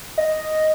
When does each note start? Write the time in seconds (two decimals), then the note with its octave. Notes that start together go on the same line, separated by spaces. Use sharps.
0.18 D#5